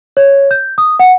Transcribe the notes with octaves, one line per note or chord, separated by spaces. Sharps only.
C#5
G6
D#6
F#5